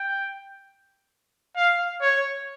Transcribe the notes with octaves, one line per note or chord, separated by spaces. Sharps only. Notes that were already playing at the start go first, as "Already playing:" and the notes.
Already playing: G5
F5
C#5